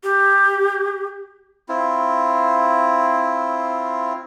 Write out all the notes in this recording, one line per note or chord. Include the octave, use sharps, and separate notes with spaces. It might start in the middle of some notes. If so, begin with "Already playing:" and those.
G4
C4 E4 F4